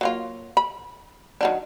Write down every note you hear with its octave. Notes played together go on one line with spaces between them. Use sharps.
F#3 A#3 F4
B5
D#3 F#3 D4